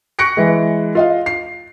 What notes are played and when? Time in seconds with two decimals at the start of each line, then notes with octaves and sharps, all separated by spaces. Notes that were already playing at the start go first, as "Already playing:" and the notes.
0.19 C#6 F#6 A#6 C#7 D7
0.37 E3 G#3
0.95 F4 D#5 F5
1.26 C7